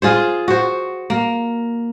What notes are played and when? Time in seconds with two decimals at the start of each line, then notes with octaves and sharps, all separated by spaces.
0.02 F4 G#4 C5
0.48 F#4 C5
1.10 A#3